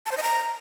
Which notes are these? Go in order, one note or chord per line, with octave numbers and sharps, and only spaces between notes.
A5
C5
D#5
A#5